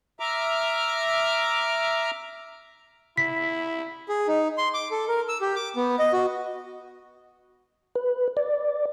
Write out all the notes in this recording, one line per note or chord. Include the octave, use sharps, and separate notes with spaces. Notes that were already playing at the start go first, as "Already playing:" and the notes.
E5 A#5 D6 F6
E4 B6
G#4
D#4
C6
D6
A4
A#4
E6
G4
D6
B3
D#5
F#4
B4
D5